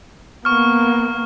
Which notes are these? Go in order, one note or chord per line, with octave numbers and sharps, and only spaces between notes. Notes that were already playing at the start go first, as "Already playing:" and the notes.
A#3 B3 C#6 F6